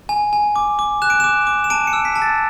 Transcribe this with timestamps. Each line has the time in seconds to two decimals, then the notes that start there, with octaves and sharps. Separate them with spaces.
0.09 G#5
0.33 G#5
0.56 D6
0.79 D6
1.02 F#6 E7
1.10 D7
1.20 D6 E7
1.47 D6
1.64 E7
1.70 A5 D7
1.87 C#7
1.93 E6
2.05 B6
2.16 A5
2.22 A6